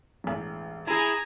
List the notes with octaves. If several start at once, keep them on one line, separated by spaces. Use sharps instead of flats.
E1 A1
E4 G#4 G#5 A#5